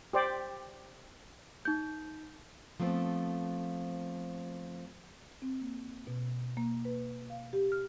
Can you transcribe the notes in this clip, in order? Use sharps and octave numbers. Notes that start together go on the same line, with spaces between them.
G4 C5 D5 G5
D#4 G6
F3 A3 B3 C4
C4
A#3
B2
A#3
B4
F5
G4
F6